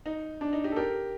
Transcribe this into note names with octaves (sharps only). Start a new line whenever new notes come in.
D#4
D4
D#4
D#4 G4
A4
G4 A#4